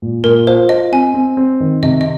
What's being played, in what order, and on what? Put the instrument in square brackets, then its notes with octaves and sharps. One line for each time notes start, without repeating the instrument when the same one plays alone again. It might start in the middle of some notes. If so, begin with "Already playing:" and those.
[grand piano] A#2
[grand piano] A#2 [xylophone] A#4
[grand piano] F4 [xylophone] C5
[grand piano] F4 [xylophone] D#5
[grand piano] C4 [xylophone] G#5
[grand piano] C4
C4
D#3
[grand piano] C3 [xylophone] D#5
[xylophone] D#5